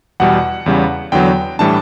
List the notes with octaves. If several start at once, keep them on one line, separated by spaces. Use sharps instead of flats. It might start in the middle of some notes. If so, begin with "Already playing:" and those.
E2 B2 G3 F#5
E2 C#3 G3
E2 D3 F#3 B3 G5
A2 E3 G3 D4 A5